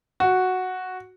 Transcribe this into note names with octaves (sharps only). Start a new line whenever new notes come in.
F#4